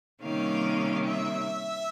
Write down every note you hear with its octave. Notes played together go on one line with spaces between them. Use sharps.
C3 D#3 G3 A#3 C#4 F5
E5